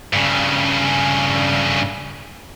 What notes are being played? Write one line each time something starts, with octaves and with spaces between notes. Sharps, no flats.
G2 C#3